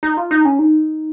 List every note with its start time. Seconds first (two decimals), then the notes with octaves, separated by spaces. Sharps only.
0.03 D#4
0.17 F4
0.31 D#4
0.45 C#4
0.59 D#4